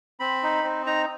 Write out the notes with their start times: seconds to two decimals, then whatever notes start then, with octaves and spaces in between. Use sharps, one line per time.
0.20 C4 B5
0.43 D#4
0.64 C4
0.86 D#4 A#5